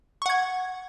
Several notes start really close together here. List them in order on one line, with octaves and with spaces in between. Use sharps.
C#6 F#5 G#6